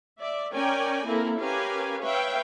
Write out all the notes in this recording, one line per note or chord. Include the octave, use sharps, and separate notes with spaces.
D5 E5
C#4 A#4 C#5 D5 G5 G#5
A#3 C4 E4 A4 A#4
C#4 G4 A#4 B4 F5 G#5
B4 C#5 E5 F5 G5